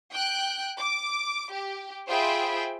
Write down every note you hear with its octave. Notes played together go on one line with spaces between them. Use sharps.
G5 F#6 G6
D6
G4
F4 G#4 C5 E5 G5 B5